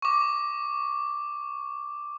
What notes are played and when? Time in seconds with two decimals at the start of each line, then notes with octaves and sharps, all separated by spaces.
0.02 C#6 D6